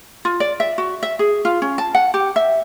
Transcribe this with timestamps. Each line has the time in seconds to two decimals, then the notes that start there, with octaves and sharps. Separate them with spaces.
0.25 F4
0.40 D5
0.60 E5
0.78 F#4
1.03 E5
1.19 G#4
1.45 F4
1.62 C#4
1.78 A5
1.95 F#5
2.14 G4
2.36 E5